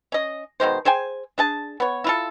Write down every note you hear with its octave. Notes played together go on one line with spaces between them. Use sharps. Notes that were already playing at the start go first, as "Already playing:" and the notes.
C#4 D#5
B2 D#3 G#3 C5
G#4 C5 G5 G#5
D4 G#4 A5
B3 C#5
E4 F4 A4